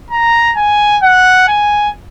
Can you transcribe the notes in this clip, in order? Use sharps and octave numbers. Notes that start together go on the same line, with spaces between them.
A#5
G#5
F#5
G#5